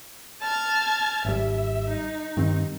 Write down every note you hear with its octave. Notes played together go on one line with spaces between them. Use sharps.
A5 F6 G#6
G#1 G3 E5
D#4
G2 D#3 C4